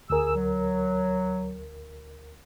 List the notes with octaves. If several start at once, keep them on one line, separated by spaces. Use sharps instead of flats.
D2 G#4 A#4 E6
F#3